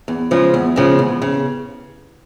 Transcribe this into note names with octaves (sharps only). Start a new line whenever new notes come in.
E2
C#3 F3 G#3
E2
C#3 F3 G#3
E2
C#3